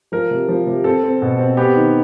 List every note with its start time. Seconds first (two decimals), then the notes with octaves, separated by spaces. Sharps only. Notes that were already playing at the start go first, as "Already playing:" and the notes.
0.12 F3 A#4
0.31 C3
0.48 F3
0.67 C3
0.84 C4 A4
1.03 C4
1.22 B2
1.39 C4
1.57 B3 G4
1.76 D#3